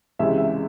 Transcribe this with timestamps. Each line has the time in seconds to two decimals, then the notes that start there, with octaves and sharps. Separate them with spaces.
0.19 C#2 C3 E3 G#3 C#4 E5
0.37 E5